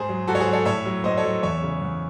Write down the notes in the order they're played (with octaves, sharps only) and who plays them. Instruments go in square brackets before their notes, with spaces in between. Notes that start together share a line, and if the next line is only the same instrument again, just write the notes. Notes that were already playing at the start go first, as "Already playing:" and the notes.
Already playing: [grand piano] G#2 G#4 C5
F#3
G#2 F#4 A4
C#5
G#4 C5
F#3
A4 C#5
A2 C#5 E5
F#3
A2 C5 D#5
A4 C#5
F#3
E2 C#5 E5
C#3 G#3
E2